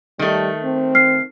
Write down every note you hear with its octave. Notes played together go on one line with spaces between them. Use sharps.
D#3 G3 A3
C4
F6 C7